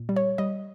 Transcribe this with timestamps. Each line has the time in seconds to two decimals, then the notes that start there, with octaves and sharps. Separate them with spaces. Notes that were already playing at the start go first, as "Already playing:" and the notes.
Already playing: A#2
0.09 G3
0.16 C#5
0.38 G3 D#5